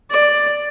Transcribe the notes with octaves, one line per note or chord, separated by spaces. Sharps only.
D5